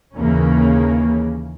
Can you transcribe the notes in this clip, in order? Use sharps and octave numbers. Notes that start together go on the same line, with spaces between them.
D#2 C#3 E3 A#3 C#4